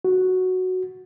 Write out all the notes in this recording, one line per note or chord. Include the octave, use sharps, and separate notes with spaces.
F#4